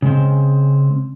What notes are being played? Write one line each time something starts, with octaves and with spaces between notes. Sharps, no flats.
C#3 G#3 C4